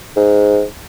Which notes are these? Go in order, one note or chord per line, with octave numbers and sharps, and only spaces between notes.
G#2